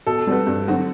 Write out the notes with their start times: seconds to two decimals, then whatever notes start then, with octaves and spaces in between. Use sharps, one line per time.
0.07 B2 A4
0.27 G3 C4 F#4 B4
0.47 G2
0.68 D3 F#3 C4 F#4